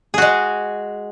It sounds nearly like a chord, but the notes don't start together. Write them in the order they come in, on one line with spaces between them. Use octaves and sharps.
G#4 F#4 G#3